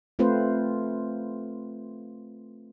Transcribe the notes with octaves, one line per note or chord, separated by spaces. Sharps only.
A3 C4 F4 B4 C5